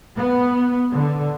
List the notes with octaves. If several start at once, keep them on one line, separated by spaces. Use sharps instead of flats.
B3
D3